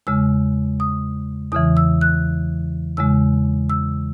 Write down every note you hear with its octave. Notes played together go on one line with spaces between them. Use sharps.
E2 C#3 G#3 E6
D#6
E2 C#3 E3 D#6
E6
F#6
E2 C#3 G#3 E6
E6